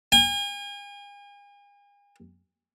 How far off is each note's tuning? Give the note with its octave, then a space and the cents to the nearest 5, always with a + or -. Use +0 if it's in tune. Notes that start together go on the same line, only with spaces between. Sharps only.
G#5 -40